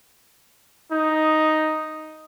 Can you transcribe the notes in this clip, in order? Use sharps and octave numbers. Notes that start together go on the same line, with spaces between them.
D#4